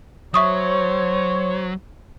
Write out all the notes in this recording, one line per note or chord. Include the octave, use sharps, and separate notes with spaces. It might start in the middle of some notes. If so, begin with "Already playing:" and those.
F#3 C5 C#5 E5 C#6 D#6